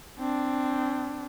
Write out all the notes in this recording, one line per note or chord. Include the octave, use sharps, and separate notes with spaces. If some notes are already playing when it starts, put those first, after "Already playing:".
C4 D4